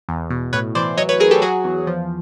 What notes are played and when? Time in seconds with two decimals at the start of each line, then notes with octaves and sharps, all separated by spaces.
0.09 E2
0.30 B2
0.53 A2 B4 C#5
0.75 E3 C5 D5
0.97 F#3 C#5 D#5
1.09 B4 C#5
1.20 F#3 G#4 A#4
1.31 G4 A4
1.42 F#3 F#4 G#4
1.64 E2
1.87 F3